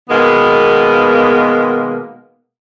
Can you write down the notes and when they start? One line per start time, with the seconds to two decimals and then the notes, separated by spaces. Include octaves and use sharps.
0.10 B2 D#3 G#3 A#3 B3